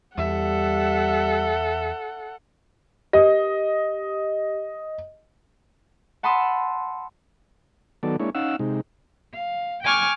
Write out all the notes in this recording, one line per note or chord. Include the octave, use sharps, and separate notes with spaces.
E2 G3 A4 E5 F#5
G4 D#5
F#5 A5 B5 C6 D#6 E6
D#3 F#3 B3 A4 D5
G#3 A#3 D4 E4 C#5
C#4 D#4 F5 F#5 E6
C3 G#3 D#4
F5
G5 G#5 C#6 D6 F6 G#6